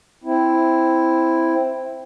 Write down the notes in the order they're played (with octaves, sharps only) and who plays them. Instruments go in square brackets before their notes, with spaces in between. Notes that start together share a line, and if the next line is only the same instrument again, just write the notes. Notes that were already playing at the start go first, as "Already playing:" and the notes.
[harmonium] C4 E4